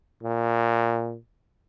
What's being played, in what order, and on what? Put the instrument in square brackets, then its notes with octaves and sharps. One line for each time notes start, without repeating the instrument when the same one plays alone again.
[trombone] A#2